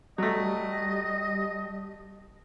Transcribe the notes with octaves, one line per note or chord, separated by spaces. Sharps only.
F#3 G3 A3 D#5